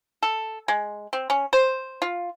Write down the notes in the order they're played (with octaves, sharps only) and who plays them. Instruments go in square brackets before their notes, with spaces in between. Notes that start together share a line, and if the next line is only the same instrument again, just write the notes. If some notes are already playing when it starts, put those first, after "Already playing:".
[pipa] A4
G#3
C4
C#4
C5
F4